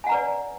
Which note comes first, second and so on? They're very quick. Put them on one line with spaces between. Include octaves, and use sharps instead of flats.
G#5 F#5 A#5 B4 D5